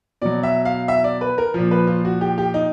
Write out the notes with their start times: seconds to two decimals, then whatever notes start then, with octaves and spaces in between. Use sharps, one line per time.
0.22 B2 F#3 D5
0.43 E5
0.65 F5
0.88 E5
1.04 D5
1.21 B4
1.38 A#4
1.54 A#2 F3
1.71 B4
1.87 F4
2.05 F#4
2.21 G4
2.38 G4
2.54 D#4